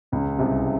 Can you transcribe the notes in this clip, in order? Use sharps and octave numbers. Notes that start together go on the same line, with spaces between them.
C#2 C#3
C2 C3